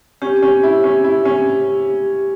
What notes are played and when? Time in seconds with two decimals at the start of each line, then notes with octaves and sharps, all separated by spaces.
0.22 C#4 G4
0.42 C#4
0.63 E4
0.84 C#4
1.04 E4
1.25 C#4